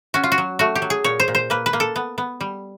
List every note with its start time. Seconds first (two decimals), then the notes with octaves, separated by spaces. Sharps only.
0.14 C#4 F#4
0.24 F4
0.32 F#4
0.38 F#3
0.59 A3 F#4
0.75 G4
0.82 F#3
0.90 G#4
1.04 A#2 C#5
1.20 C5
1.28 A#2
1.35 C5
1.50 A#3 B4
1.66 B4
1.73 A#3
1.80 A4
1.96 B3
2.18 B3
2.41 G3